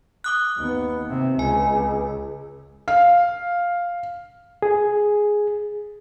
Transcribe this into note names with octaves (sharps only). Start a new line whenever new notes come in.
D6 D#6 F#6
D#2 B3
C3
C#2 G#5
F5
G#4